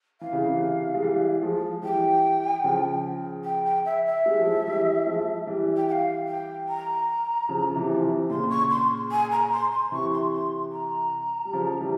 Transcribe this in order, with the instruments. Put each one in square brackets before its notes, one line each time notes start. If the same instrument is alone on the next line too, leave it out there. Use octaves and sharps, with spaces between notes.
[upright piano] E3 [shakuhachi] F5
[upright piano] C#3
C3 E3
G#3
E3 G3
F3 G#3
[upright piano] E3 G3 [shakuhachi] G5
[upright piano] C#3 F3
[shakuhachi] G5
G5
E5
E5
[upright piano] G#3
G3
F3 G#3
E3 G3
F3 G#3
E3 G3
[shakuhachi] G5
G5
F5
G5
A#5
[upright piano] C#3 F3
F3
C3 E3
F3
C3 E3
[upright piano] A#2 C#3 [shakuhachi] C6
[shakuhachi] C#6
C6
G#5
A#5
C6
C6
[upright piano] C3 E3 [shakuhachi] C#6
[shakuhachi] C6
C6
A#5
[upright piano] G3
C#3 F3
E3 G3